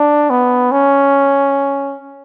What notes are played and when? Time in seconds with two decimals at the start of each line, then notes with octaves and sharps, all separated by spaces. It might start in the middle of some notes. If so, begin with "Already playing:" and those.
Already playing: D4
0.30 B3
0.72 C#4